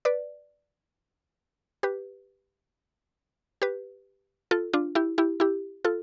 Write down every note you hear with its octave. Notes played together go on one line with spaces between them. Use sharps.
B4 D5
G4 B4
G4 B4
F4 A4
D4 F4
E4 G4
E4 G4
E4 G4
F4 A4